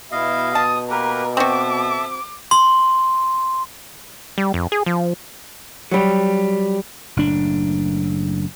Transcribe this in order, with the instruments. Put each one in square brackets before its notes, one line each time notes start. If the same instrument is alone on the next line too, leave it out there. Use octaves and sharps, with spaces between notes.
[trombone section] B2 [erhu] E4 [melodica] D#5 F5
[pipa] A5 [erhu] D#6
[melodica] A#3 G4 B4 [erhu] A#4
[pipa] C4 F#4 [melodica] A4 E5 [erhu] D6
[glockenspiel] C6
[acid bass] G3
F2
G#4
F3
[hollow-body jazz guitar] F#3 G3
[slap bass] F#1 A2 D4